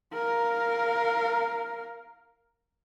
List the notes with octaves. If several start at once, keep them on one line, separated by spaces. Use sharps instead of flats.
A#4 F5